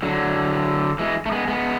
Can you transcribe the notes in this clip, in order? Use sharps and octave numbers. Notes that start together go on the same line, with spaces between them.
D3 F#3
E3 G#3
A3
G#3 B3
G#3 B3